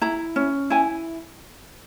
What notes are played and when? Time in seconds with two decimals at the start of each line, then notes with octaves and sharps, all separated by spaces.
0.01 E4 A#5
0.36 C#4
0.70 E4 G#5